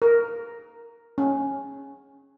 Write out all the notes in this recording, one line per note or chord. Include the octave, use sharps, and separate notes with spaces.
A#4
C#4